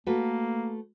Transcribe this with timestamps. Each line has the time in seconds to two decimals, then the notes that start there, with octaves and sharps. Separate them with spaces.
0.06 A3 A#3 F#4 B4